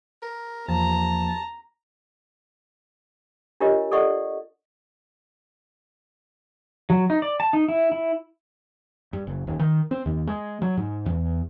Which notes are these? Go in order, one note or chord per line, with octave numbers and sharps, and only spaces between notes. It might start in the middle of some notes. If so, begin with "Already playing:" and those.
A#4
E2 F3 A#3 A5 A#5
D4 F4 G4 A#4 C#5 D#5
A4 D5 D#5 F#5 C#6
F#3
D#4
D5
A5
D#4
E4
E4
G2
F#1
D#1
D#3
C4
D#2
G#3
F#3
G#2
E2